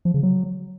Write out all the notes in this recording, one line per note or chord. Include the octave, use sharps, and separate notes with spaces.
F3
C#3
F#3